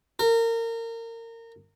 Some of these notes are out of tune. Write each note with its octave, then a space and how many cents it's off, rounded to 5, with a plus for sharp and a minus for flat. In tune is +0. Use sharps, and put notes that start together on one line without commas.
A#4 -25